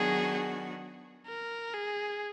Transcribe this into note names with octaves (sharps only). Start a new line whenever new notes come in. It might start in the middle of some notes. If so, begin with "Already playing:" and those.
Already playing: D#3 F#3 B3 D4 F#4 G#4
A#4
G#4